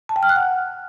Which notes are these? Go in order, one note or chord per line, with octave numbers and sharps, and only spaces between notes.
A5
G5
F6
F#6
F#5